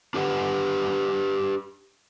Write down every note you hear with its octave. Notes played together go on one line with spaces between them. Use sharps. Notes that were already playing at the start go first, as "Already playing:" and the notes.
D4 G4 B4 F#5